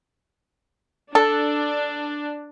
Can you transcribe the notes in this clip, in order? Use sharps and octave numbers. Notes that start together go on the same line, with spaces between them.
D4 A4